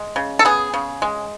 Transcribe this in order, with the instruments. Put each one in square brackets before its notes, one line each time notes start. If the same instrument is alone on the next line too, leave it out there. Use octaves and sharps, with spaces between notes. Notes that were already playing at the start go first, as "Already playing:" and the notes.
Already playing: [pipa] G#3
C#3
A4
B3 G#4
C#3
G#3